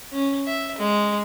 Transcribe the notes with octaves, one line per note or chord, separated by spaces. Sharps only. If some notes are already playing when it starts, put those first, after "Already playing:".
C#4
E5
G#3